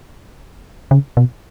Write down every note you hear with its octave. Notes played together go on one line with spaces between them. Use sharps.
C#3
B2